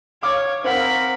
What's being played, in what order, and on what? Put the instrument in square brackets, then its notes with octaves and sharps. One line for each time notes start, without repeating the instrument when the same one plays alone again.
[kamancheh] C#5 [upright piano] F5 D6 F6
[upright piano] C4 F5 F#5 [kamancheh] A#4 B5